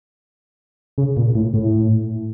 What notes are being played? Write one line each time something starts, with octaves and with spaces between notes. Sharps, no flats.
C#3
A#2
A2
A2